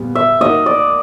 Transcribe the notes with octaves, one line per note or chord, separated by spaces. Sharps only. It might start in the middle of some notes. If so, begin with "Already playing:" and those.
Already playing: A#2 G3 B3
E5
A#3 D#4 F#4 A#4 D#5
D5